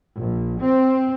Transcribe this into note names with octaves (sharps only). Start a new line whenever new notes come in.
A#1
C4